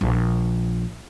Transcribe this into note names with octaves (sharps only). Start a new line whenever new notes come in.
A#1